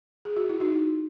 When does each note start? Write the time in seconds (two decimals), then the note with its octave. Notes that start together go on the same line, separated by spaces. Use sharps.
0.25 G#4
0.36 F#4
0.49 E4
0.60 D#4 F#4